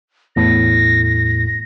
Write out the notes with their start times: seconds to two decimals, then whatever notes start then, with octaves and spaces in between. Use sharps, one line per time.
0.36 E2 A2 A#6